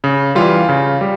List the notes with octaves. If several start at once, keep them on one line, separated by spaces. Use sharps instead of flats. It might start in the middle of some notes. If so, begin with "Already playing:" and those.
C#3
E3 G3 F4
C#3
G3